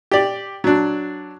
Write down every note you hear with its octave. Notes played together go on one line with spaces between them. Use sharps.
G4 D5
F#3 D4